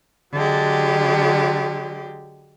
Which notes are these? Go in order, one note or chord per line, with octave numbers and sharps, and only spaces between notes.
D3 F#3 G#3 G4